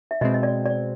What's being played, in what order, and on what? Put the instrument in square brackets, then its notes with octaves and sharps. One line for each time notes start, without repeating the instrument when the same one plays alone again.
[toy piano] E5
[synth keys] B2 G#3 C4 [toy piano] D#5
[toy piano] D#5
D5
D5